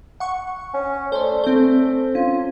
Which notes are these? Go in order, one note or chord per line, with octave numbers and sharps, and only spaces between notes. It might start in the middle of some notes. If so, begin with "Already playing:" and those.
F#5 C#6
C#4
A3 C5 D5
A3 C4 C5
C#4 F4